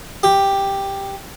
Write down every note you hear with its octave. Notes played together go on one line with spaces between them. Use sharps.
G4